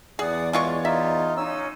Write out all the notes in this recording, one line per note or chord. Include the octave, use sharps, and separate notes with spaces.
E2 G#4 D5 F#5 D#6
G#3 F4 C#5 D5 C#6
D#4 F4 E5
C#4 D#4 E6